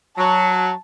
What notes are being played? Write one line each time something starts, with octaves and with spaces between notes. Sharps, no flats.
F#3 A5